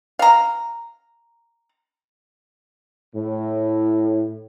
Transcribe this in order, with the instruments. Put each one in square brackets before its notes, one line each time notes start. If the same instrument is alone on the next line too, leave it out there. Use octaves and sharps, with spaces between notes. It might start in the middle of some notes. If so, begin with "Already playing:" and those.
[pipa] F5 A#5
[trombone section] A2